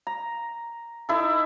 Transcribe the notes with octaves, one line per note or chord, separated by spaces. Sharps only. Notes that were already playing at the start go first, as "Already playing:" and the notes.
A#5
D#4 E4 A4